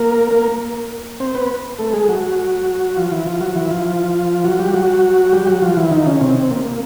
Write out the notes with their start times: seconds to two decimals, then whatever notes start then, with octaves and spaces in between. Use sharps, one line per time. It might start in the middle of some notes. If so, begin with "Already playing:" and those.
Already playing: A#3 A#4
0.31 A#3 A#4
1.20 C4 C5
1.34 B3 B4
1.79 A3 A4
1.93 G#3 G#4
2.09 F#3 F#4
2.97 F3 F4
3.11 E3 E4
3.26 F3 F4
3.41 F#3 F#4
3.56 E3 E4
3.71 F3 F4
4.44 F#3 F#4
4.59 G3 G4
4.74 F#3 F#4
5.32 G3 G4
5.47 F#3 F#4
5.62 F3 F4
5.77 E3 E4
5.91 D#3 D#4
6.06 C#3 C#4
6.21 C3 C4
6.51 A#3
6.65 A#3